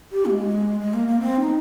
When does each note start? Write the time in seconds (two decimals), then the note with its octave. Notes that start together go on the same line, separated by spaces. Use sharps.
0.12 G4
0.25 A#3
0.30 G#3
0.80 G#3
0.93 A#3
1.07 A#3
1.20 C4
1.40 D#4